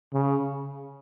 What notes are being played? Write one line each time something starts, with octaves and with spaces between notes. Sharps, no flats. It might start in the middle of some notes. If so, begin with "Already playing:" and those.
C#3